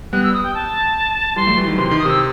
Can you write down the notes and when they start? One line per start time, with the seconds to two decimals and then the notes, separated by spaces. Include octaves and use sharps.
0.13 G3 B3 F#6
0.23 E6
0.34 D#6
0.43 G5
0.54 A5
1.36 E3 G3 C6
1.47 F#3 A3
1.58 E3 G3
1.67 D#3 F#3
1.77 C3 E3 C6
1.88 D#3 C6
1.99 D#6
2.05 C3 E6